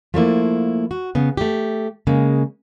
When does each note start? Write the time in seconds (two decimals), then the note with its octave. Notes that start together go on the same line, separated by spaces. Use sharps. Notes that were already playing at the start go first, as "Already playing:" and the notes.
0.14 F3 A3 A#3 E4
0.91 F#4
1.15 C#3 B3
1.37 A3 G4
2.07 C#3 G#3 A#3